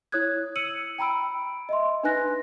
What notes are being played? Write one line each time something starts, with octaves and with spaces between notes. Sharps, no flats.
E4 C#5 D#6 F#6 G#6
E6 C#7 D#7 F#7
G5 A#5 B5 E6 D7
D#5 E5 C6
D4 D#4 B4 G#5 F#6 A#6